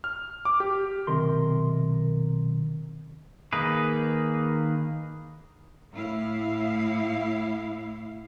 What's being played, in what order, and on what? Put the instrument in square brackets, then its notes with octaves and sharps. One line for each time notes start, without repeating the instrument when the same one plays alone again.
[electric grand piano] F6
D6
G4
[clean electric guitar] B1 C3 D#3 A#4 C6
[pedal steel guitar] D#3 A#3 D#4 G#4 B4
[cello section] A2 E4 F5